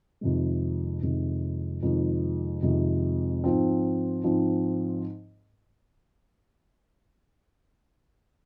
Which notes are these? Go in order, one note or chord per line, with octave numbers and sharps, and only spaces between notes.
F2 C3 D#3 G#3
F2 C3 D#3 G#3
F2 C3 D#3 G#3
F2 C3 D#3 G#3
G#2 F3 C4
G#2 F3 C4